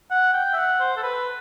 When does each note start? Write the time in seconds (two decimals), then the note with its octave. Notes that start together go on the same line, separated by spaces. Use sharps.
0.11 F#5
0.34 G5
0.53 E5
0.56 F#5
0.80 C5
0.97 A4
1.03 B4